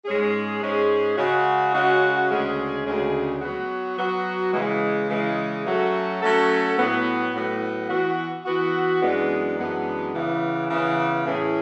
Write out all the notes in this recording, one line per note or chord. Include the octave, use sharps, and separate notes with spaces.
G#2 G#3 C#4 G#4
G#2 G#3 C#4 G#4
C#3 G#3 C#4 F#4
C#3 G#3 C#4 F#4
D2 C#3 G#3 C#4 G#4
D2 C#3 G#3 C#4 G#4
F#3 B3 F#4
F#3 B3 F#4
C#3 E3 G#3
C#3 E3 G#3
F#3 A3 C#4 F#4 A4
F#3 A3 C#4 F#4 A4
A2 F#3 B3
A2 F#3 B3
E3 B3 F#4
E3 B3 F#4
F#2 E3 G#3 B3 D4
F#2 E3 G#3 B3 D4
C#3 E3 B3
C#3 E3 B3
A2 E3 A3 C#4 G#4